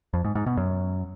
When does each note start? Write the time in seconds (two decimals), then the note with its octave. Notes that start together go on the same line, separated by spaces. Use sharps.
0.14 F2
0.24 G#2
0.35 G#2
0.46 B2
0.57 F#2